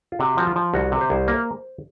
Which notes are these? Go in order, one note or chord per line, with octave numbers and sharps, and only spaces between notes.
F4
C3 F#4
F3 F#4
F4
F3
C2 F#4
C3
C5
C2
A#3